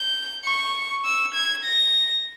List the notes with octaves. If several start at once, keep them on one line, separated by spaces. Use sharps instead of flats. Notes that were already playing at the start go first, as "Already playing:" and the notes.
Already playing: G6
C#6
E6
G#6
A#6